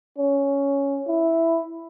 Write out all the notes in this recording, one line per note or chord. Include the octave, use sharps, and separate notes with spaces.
C#4
E4